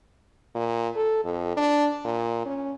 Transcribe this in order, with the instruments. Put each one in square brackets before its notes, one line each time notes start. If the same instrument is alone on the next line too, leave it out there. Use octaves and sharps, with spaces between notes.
[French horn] A#2
A4
F2
D4
A#2
C#4